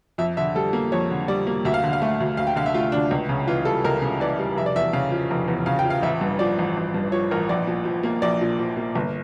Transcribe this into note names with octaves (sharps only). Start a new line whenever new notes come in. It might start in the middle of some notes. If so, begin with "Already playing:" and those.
F2 E5
D3 E5
G3 A4
A#3
F2 C#5
D3
G3 D5
A#3
D2 E5
F5
D3
F5
A3
D2
D2 F5
G5
D3 F5
E5
A3 F4
D2 D4
C#2
C#3
E3 F4
G3 A4
C#2 A#4
C#3
E3 D5
G3
F1 E5
D5
E2 E5
C#3 F5
F3
F1
E2
C#3 F5
G5
F3
F5
A1 E5
G2
F3 D5
A1
A1
G2
F3 C#5
A1 A#4
A#1 D5
A#2
F3
A#3
A#1 D5
A#2
F3
A#3
G1